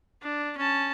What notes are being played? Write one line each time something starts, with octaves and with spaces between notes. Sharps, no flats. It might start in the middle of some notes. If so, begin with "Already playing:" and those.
D4
C#4 A5